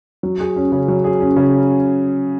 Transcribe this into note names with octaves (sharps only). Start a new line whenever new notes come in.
F#3
G#4
C#4
C#3
F#3
G#4
C#4
C#3